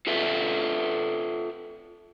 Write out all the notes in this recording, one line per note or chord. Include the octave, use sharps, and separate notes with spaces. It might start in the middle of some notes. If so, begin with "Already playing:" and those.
F4 A4 B4 E5